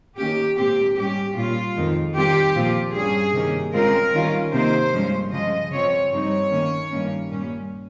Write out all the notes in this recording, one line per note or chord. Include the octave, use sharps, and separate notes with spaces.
D#3 A#3 C#4 G4
A#2 G#3 C4 G4
G#2 G3 C#4 G4
A#2 G3 C#4 F4
F2 D#3 G#3
D#3 G3 C4 F4 G4
A#2 F3 C4 F4
G2 G3 C#4 G#4
C3 D#3 A#3 C#4
C#3 G#3 C4 F4 A#4
D#3 G3 C#4 F4
C3 D#3 A#3 D#4 C5
G2 F3 G#3 C#4
C#3 F3 G#3 D#5
C#3 F3 C4 C#5
G2 G3 C4 D#4 C#5
D#3 A#3 C#4
G2 D#3 A#3 C#4
A#2 G3 C#4